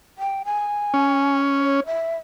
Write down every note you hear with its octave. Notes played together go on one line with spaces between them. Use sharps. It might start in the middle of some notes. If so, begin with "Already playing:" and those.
G5
G#5
C#4
C#5
E5